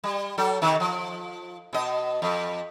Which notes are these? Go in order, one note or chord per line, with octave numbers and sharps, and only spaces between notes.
G3
F#3 A4
C3 D#3
F3
B2 D#5
F2